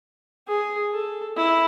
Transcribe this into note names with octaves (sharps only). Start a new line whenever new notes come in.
G#4
A4
E4